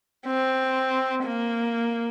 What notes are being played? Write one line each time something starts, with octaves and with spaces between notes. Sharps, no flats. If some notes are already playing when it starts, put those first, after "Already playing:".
C4
A#3